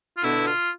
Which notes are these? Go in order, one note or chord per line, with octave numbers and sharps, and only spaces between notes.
F4
B2 D3 E4
F4